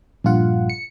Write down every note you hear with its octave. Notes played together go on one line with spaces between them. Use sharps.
A#1 G2 F4 F#5
C#7